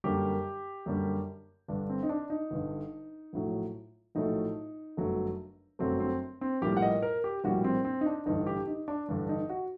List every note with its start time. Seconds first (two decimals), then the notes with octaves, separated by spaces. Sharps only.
0.04 F#2 D3 G3 A#3 G4
0.86 F#2 D3 G3 A#3
1.68 G1 G2 D3 D4
1.90 C4
2.03 D#4
2.09 D4
2.30 D#4
2.51 G1 G2 D3
3.33 A#1 A2 F#3 A3
4.15 A#1 A2 F#3 A3 D#4
4.97 G1 F#2 F#3 A3
5.79 G1 F#2 F#3 A3 C4
6.00 C4
6.41 C4
6.62 A#1 A2 G3 A#3 G4
6.77 F#5
6.82 D#5
7.02 A#4
7.24 G4
7.44 A#1 A2 G3 A#3 F#4
7.64 C4
7.85 C4
8.01 D#4
8.06 D4
8.26 A1 G2 D3 D#4
8.47 G4
8.67 D#4
8.88 D4
9.09 A1 G2 D3 D4
9.29 D#4
9.50 F#4